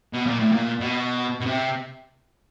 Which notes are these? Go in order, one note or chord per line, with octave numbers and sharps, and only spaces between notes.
B2
A#2
A2
A#2
B2
B2
C3